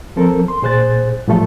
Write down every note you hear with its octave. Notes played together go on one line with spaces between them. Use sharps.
F3 C4 A4 A#4
C6
A#2 G#4 C5 F#6 A6
A2 F3 G3 A3 F4 A4